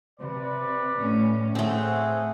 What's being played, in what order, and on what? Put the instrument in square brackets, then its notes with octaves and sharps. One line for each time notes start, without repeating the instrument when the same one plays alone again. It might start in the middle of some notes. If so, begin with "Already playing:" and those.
[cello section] C3 [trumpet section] B4 D5
[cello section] A2 A3 C#4
[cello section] A2 [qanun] A3 C4 [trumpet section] G#4 C5 F#5